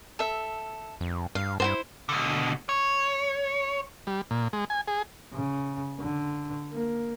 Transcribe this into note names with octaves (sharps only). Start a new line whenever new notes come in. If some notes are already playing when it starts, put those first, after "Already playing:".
A4 E5
F2
G2 F5
G2 E4 F#4 C5
B2 D3
C#5
G3
A#2
G#3
G#5
G#4
C#3
D3
A#3